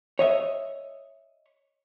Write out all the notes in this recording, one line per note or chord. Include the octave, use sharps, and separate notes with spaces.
C#5 D#5 E5